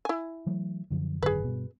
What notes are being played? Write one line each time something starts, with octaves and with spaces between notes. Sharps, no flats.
E4 G#5
E3 F#3 A3
F#2 D3 F3
G#1 F#2 D3 G#4 B4
G2 B2